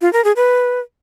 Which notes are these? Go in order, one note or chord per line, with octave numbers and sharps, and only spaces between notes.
F4
A#4
G#4
B4